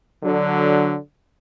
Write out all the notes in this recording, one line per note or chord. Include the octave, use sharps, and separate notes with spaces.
D3 F#3